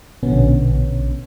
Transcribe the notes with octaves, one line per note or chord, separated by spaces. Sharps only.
A#1 B2 D3 B3 C#4